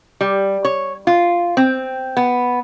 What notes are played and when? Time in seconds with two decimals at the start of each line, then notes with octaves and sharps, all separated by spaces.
0.21 G3
0.65 C#5
1.07 F4
1.57 C4
2.17 B3